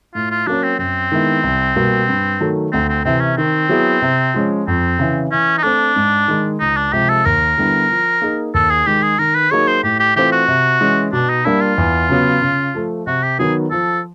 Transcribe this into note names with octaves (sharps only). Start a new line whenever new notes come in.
A2 F4
F4
F#3 A#3 C#4 D4
C4
F#2 C4
D#3 G#3 B3 E4
C2
B2 G3 A#3
G2
D#3 F#3 A3
D2 C4
C4
C3 E3 C4
C#4
D#3 C4
F#3 B3 E4 G#4
C3
F3 G#3 C#4
F2 C4
C#3 E3
E3 C#4
D#4
A3 C4 D4
G#2
D#3 G#3
C#2 D#4
D4
C3 F3 G#3 G4
A4
D#2 A#4
D3 G3 B3 E4
F3
A#3 D#4 G#4
D#2 A4
G#4
D#3 G#3 G4
G#4
D#3 A#4
B4
F#3 A#3 D#4 G#4 C#5
C5
A2 G4
G4
E3 A3 C4 F4 G4
F#4
C3
E3 G#3 C#4
B2 D4
D#4
G3 A#3 D4 E4
F4
E2
C#3 F#3 B3
C#3
F3 A3
C3 F#4
G4
D#3 F#3 B3 G#4
F3 A4